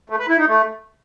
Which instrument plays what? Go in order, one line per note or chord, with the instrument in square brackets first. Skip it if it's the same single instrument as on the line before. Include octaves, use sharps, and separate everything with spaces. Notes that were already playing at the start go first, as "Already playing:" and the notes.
[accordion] A3
B4
E4
D#4
A3